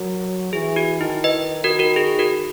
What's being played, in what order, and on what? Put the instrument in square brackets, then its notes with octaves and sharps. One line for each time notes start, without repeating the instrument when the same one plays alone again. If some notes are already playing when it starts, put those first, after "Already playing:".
Already playing: [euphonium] F#3 [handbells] F#4 A#4
[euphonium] E3 [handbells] G#4
[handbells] F#4
[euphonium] D#3 [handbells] E4
[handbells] B4 D#5
F#4 A#4
F#4 A#4
G#4
F#4 A#4